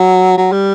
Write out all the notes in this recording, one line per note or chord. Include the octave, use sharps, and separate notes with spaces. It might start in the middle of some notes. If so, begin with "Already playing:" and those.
Already playing: F#3
F#3
G3